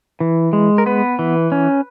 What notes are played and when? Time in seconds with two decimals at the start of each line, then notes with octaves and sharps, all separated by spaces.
0.20 E3
0.53 G#3
0.78 A#4
0.86 B3 B4
1.19 E3
1.52 C#4